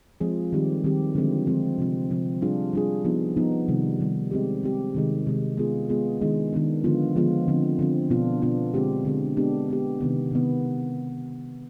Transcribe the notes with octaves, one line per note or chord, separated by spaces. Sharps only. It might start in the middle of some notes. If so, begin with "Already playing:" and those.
F3 G#3 C4 F4 G#4
D#3 G3 C4 G4
D#3 G3 C4 G4
D3 F3 G#3 C4 F4
D3 F3 G#3 C4 F4
C3 F3 C4
C3 F3 C4
G3 D4 F4 G#4
G3 D4 F4 G#4
F3 B3 D#4
F3 B3 D#4
C3 D#3 G3
C3 D#3 G3
G#3 C4 G4
G#3 C4 G4
C3 D#3 G#3
C3 D#3 G#3
G#3 B3 F4 G#4
G#3 B3 F4 G#4
D#3 G#3 B3 D4
D#3 G#3 B3 D4
D3 F3 G#3 B3 F4
D3 F3 G#3 B3 F4
D3 F3 C4
D3 F3 C4
B2 B3 D4 F4
B2 B3 D4 F4
D3 G#3 C4 G4
D3 G#3 C4 G4
G#3 B3 D4 G4
G#3 B3 D4 G4
C3 D#3 B3
C3 D#3 B3